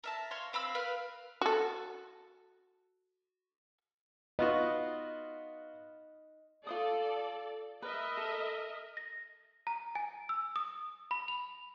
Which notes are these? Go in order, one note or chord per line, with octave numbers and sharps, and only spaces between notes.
A#4 E5 A5
C#5 F5 C6
C4 F5 B5 E6
A#4 B4 F5
F#4 A4
B3 F4 F#4 D#5
F4 A4 C5 D5 D#6
A#4 B4 D#5 E5
A4
A#6
A#5
G#5
E6
D#6
B5
F7